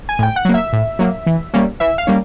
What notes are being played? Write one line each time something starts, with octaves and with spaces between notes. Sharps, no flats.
G#5
A2 G5
F#5
F#3 A#3
E5
A2
F#3 A#3
E3
G3 A#3 C#4
E3 E5
F5
G3 A#3 C#4